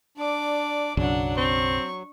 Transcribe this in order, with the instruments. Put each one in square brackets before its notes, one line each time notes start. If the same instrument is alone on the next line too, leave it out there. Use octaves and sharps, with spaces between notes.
[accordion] D4 [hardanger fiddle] D5 D6
[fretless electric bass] B1 F#2 C#3 [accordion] F#3 [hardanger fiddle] D4 F#5
[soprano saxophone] C4 [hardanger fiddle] C#6